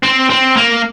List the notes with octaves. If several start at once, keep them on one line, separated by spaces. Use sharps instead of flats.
C4
C4
A#3